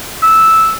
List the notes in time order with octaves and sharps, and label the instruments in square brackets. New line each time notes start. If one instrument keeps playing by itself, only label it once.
[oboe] E6